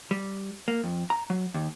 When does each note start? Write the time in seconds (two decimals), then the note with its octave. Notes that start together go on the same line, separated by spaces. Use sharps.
0.11 G3
0.68 A#3
0.84 F2
1.10 A#5
1.30 F#3
1.54 D#2